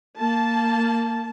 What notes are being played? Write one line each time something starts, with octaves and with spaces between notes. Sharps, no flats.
A#3 A5